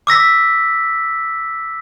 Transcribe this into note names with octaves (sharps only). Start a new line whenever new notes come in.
D6 E6 A#6 B6